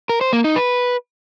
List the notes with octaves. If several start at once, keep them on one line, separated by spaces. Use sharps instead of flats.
A#4
C5
A#3
D#4
B4